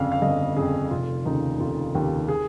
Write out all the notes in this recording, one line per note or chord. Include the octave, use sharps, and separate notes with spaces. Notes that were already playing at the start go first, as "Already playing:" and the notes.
Already playing: G1 F2 C#3 F5
F5
G1 D#5
F2 C#3 G#4
F1 F4
D#2 C#3 D#4
F1 F4
D#2 C#3 G4
G#4